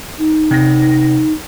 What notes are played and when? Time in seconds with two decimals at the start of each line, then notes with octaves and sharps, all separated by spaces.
0.19 D#4
0.51 C3 A#6